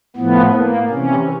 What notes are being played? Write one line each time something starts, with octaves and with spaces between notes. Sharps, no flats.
A2 F3 B3
A#3
C3 E3 C#4